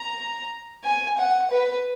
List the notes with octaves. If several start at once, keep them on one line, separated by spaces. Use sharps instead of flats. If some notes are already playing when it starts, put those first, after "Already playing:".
Already playing: A#5
G#5
F#5
B4